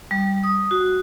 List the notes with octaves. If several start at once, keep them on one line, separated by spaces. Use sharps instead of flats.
G3
D#6
F#4